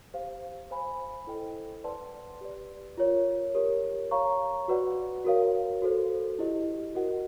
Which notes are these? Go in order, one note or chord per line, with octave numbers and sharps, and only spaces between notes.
G4 C5 F5
C5 F5 G#5 B5
E4 A4 C5 D#5 G5
B4 D5 F#5 A5 C6
G4 B4 D5
F4 A#4 C#5
G4 A#4 C#5
C#5 F5 A#5 C#6
F#4 B4 D5 F#5
F#4 A#4 C#5 F5
F#4 A4 C5
E4 G4 C5 D#5
F#4 A#4 D#5 F#5